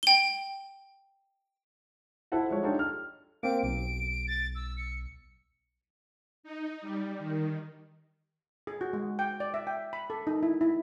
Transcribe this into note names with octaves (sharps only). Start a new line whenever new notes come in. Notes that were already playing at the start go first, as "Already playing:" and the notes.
G5 G7
E4 A4 C5 F#5 A5
F3 G#3 C#5
D4 D#4 F4 G4 A4 C#5
F6
A#3 C4 D7
B1 D7
A6
E6
C#7
D#4
G3
D#3
G#4
F#4
G#3
G5
D5
E5
G5
B5
A4
D#4
E4
E4